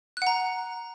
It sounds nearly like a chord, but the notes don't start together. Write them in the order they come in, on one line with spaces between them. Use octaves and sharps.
F#6 F#5 A#5